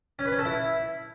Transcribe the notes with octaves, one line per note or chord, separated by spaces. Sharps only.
C#4
B4
C#4
A4
E4